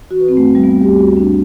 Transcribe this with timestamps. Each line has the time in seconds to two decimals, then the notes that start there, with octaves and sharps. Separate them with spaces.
0.11 E3 F#4
0.20 B4
0.28 G2 C4
0.37 A3
0.46 D2
0.55 G3
0.64 D2 B3
0.82 D2 G4
0.99 D2 F#4
1.17 F#2 D4